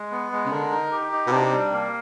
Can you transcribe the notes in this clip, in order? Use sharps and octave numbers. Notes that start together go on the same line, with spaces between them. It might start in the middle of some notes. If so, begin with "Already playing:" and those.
Already playing: G#3
B3
G#3
C#3
D3 A#4
D#4
G4
D#4
B2
C3 D4
G3
A#3